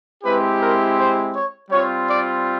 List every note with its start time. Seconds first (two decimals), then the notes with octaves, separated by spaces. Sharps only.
0.23 G#3 C4 E4 G4 B4
0.60 A#4
0.97 C5
1.33 C#5
1.70 G3 C4 F4 C#5
2.08 D5